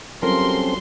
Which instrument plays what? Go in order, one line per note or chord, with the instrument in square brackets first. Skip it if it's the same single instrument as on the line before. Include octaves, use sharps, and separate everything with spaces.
[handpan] F#3 G3 F4 [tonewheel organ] C4 C#4 A4 [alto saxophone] A#4 [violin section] C6